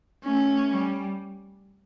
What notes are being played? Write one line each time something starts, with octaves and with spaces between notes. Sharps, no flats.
A3 C#4
G3